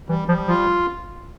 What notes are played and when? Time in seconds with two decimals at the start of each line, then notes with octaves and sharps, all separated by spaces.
0.09 E3 G3
0.28 F3 G3
0.48 F3 F4